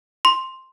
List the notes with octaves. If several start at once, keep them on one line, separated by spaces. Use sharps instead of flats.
C6